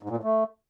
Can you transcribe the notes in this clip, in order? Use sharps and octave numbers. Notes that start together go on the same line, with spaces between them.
G#2
A#2
A2
A3